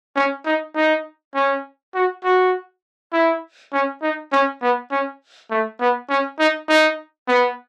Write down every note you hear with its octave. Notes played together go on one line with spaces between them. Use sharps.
C#4
D#4
D#4
C#4
F#4
F#4
E4
C#4
D#4
C#4
B3
C#4
A3
B3
C#4
D#4
D#4
B3